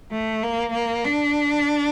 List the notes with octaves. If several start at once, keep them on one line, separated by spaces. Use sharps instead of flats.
A3
A#3
A#3
D4